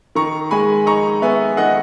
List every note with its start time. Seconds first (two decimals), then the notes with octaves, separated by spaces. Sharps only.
0.15 D#3 A#5 C#6
0.51 G#3 G#5 B5
0.86 D#4 A#5 C#6
1.22 B3 E5 G#5
1.57 D#3 D#5 F#5